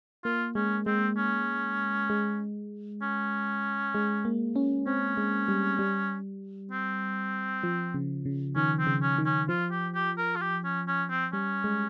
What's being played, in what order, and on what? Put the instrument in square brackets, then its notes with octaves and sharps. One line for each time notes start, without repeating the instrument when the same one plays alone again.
[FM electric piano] A#3 [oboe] F4
[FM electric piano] G#3 [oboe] C#4
[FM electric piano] G#3 [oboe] C4
[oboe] C#4
[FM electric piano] G#3
[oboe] C#4
[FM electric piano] G#3
A#3
C#4
[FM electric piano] C4 [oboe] C#4
[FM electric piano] G#3
G3
G3
[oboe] C4
[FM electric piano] F3
C#3
C#3
[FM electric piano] D#3 [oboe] C#4
[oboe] C4
[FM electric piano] C#3
[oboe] C#4
[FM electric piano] D#3
[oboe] C#4
[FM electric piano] F3 [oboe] F4
[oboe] G4
G4
A#4
F4
G4
C#4
C#4
C4
[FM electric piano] G3 [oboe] C#4
[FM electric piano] G#3